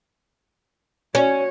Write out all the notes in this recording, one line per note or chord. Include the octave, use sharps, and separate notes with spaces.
C#4 F#4 C#5